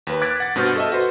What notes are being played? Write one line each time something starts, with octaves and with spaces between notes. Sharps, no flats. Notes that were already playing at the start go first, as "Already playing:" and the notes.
D#2 B4
D6 F#6 G#6 A6 B6 D7
F#5 A6
G2 B2 F#4 C5 F6 G6
A4 D#5 E5
F#4 B4 C5